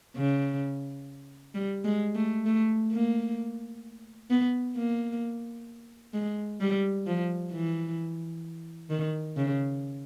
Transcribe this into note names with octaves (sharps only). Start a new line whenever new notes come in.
C#3
G3
G#3
A3
A3
A#3
B3
A#3
G#3
G3
F3
E3
D#3
C#3